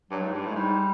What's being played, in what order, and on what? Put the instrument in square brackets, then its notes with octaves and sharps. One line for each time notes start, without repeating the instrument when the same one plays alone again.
[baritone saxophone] G2 [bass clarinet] F#3
[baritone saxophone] G#2
G2
A2
[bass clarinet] G#3
[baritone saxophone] G#2 [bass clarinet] G3